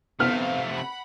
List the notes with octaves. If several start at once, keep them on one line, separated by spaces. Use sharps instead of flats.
C3 A3 B3 C4 F5 F6
F#5 B5